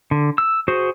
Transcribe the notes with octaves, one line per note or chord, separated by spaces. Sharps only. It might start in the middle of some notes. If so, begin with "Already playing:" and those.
D3
E6
F#4 G#4 C5